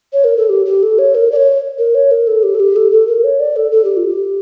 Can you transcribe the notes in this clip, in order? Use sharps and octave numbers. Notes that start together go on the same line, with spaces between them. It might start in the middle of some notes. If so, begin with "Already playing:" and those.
C#5
A#4
A4
G4
G4
A4
C#5
A#4
D5
C#5
A#4
C#5
A#4
A4
G4
A4
G4
A4
A4
A#4
C#5
D5
A4
A4
G4
F4
G4